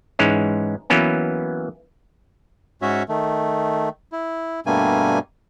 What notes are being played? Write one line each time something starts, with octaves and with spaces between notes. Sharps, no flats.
G#2 E3 G#3 C#4
E3 F#3 A#3 B3 C#4
G#2 C#4 F#4 C#5 E5
D#3 A3
E4
G2 B2 G3 A3 A#3 G#5